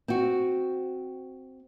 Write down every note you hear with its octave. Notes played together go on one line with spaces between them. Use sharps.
C4 F#4